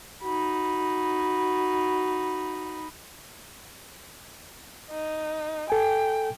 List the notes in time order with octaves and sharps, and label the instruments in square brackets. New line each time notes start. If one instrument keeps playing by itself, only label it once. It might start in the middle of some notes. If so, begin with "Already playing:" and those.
[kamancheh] D#4 B5 [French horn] F#4
[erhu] D#4
[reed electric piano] A4 G#5 [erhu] G5